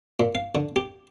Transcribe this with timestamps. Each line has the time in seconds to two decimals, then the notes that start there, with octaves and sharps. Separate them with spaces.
0.20 A#2
0.35 F5
0.55 D3
0.76 G4